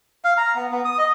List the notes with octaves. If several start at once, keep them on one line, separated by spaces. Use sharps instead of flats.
F5
A#5
B3
B3
D#6
D#5